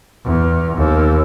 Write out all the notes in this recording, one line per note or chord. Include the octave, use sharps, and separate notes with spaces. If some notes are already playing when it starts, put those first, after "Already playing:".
E2
D#2